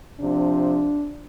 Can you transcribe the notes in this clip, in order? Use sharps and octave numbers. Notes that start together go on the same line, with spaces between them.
C3 F3 D4